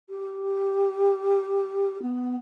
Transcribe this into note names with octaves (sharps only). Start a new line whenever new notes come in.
G4
B3